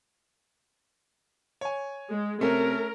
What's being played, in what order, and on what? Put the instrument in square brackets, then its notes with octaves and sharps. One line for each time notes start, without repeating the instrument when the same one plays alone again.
[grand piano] C#5 G#5
[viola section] G#3
[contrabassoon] C3 [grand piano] A3 C#4 [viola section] A#4